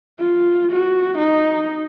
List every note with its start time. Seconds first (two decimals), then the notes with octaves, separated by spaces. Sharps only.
0.19 F4
0.72 F#4
1.18 D#4